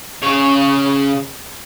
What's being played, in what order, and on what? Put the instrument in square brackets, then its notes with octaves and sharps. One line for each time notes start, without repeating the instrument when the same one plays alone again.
[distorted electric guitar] C#3 C#5